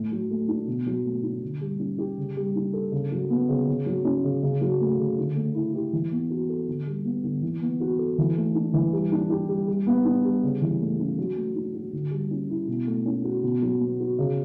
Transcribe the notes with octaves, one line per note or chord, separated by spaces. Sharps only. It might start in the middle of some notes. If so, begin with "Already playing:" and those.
Already playing: A2
F#3
A3
D4
B2
F#3
A3
D4
D3
G3
C#4
G4
C#3
G3
D4
A4
C#3
F#3
B3
C#3
C#3
F#3
C#4
C#3
C#3
F#3
A3
C#3
D3
A3
E4
G4
E3
B3
F#4
A4
D3
G3
B3
D3
E3
B3
F#4
A4
E3
A3
D4
E3
G3
D4
G4
G3
G3
B3
D4
G3
C#3
E3
A3
C#4
F#3
A3
D4
F#4
D3
G3
C#4
E4
B2
A3
C#4
F#4
B2
F#3
B3
F#4
C#3